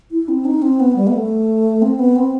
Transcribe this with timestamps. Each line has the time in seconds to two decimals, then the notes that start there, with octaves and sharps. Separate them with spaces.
0.11 E4
0.28 C4
0.45 D#4
0.62 C4
0.80 B3
0.96 G3
1.07 B3
1.14 A3
1.82 C4
1.99 B3
2.16 C4